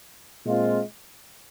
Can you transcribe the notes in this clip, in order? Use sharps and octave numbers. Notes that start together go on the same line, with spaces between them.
A#2 G#3 C4 F4